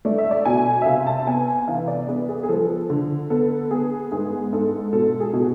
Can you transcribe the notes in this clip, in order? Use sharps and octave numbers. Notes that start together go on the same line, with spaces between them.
A3 D5
E5
D5
B2 G#5
E5
C3 F5
A5
B3 G#5
E3 F5
D5
B3 G#4
G#4
G#4
F3 A4
D3
B3 A4
B3 G#4
G#2 G#4
G#2 A4
B2 A4
G#4
B2